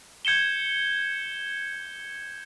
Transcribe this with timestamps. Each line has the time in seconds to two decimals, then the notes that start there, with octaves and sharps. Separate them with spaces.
0.25 G6 G#6 C#7 E7 G7